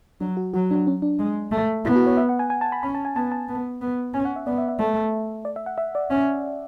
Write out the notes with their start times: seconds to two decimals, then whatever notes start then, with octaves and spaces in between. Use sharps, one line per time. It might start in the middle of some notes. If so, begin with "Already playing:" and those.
0.20 F#3 D4
0.37 F#4
0.54 F#3 F#4
0.71 D4
0.87 C#4
1.02 D4
1.19 G#3
1.52 A3
1.85 B3 E4
1.96 F#4
2.07 C#5
2.17 E5
2.29 F#5
2.39 G#5
2.50 G#5
2.61 A5
2.72 B5
2.83 C#4 B5
2.95 A5
3.05 G#5
3.16 B3 A5
3.32 A5
3.48 B3
3.81 B3
4.14 C#4 G#5
4.25 F#5
4.36 E5
4.47 B3 D5
4.58 E5
4.68 E5
4.79 A3
5.45 D5
5.56 E5
5.66 F#5
5.78 E5
5.95 D5
6.11 C#4